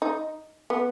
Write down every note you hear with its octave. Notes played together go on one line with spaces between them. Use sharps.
D#4
B3